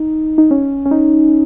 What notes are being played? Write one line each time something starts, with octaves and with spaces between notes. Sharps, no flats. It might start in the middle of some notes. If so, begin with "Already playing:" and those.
Already playing: D#4
D#4
C#4
C#4
D#4